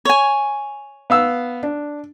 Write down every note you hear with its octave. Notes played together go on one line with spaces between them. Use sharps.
C#5 G#5
B3 F5 E6
D4